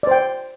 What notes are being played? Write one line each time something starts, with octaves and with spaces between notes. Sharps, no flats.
C5 D5 G5